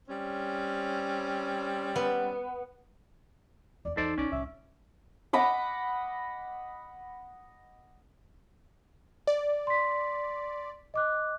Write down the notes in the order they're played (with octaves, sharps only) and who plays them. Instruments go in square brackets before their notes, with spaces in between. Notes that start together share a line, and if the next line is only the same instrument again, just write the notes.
[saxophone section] G3 C4 C#4
[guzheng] B3
[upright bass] E2 C#4 [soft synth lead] D5
[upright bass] E2 E3 [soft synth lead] D#4 [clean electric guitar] A4 C5 D5
[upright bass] B1 [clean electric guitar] C#4 D5
[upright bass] C2 A2 [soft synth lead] E5
[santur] D#5 F#5 B5 D6
[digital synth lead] D5
[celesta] C6 B6
D#5 D6 F#6